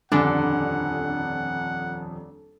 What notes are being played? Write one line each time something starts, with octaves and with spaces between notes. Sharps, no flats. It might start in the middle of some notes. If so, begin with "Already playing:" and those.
D#1 F2 D3 D4 F#5 G#5